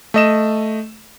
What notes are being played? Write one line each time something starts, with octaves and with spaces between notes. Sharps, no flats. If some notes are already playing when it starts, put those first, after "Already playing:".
A3 D#5 E7